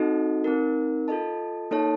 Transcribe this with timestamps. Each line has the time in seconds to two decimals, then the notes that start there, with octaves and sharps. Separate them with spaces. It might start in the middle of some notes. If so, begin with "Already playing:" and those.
Already playing: C4 D#4 F#4 A4 D#5
0.44 C4 D#4 A#4
1.08 F4 A4 D#5 A5
1.71 A#3 D#4 A4 C#5 A5